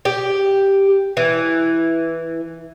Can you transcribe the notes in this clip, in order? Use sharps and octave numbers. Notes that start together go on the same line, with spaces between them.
G4
E3